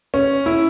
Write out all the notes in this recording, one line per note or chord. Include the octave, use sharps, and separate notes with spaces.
C#4
E4